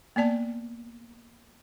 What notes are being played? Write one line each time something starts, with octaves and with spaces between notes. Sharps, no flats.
A#3 B3 D5 A5